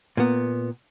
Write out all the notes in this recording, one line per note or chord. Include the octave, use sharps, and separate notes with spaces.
A#2 B3